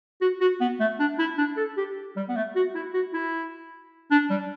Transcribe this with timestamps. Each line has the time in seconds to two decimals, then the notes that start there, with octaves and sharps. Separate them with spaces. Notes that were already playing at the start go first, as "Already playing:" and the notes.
0.21 F#4
0.41 F#4
0.61 B3
0.80 A3
1.00 D4
1.19 E4
1.38 D4
1.57 A4
1.77 G4
2.17 G3
2.29 B3
2.36 A3
2.56 F#4
2.75 E4
2.94 F#4
3.14 E4
4.11 D4
4.30 G3